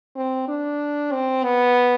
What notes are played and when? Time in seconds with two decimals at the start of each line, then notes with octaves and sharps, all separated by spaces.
0.16 C4
0.48 D4
1.13 C4
1.44 B3